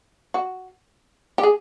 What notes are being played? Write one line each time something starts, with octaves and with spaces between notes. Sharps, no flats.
F#4
G4
G#4